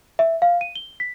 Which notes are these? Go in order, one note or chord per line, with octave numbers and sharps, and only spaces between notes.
E5
F5
D#7
G7
B6